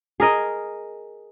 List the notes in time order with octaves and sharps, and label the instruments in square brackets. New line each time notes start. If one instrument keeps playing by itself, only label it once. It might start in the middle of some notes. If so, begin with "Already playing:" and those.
[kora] G#4 A#4 D#5